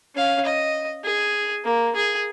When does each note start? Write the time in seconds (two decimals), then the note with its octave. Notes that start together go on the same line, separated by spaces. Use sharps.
0.15 C#4 F5
0.45 D#5
1.04 G#4
1.64 A#3
1.96 G#4